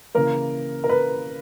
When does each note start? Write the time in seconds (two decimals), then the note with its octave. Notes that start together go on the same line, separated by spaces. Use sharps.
0.15 C#3 E3 A#3 A#4
0.84 A#4
0.89 B4